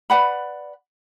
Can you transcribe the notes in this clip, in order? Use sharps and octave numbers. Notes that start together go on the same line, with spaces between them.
B4 D5 F#5 B5